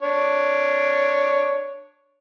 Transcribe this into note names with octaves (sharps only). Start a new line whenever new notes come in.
D4 C#5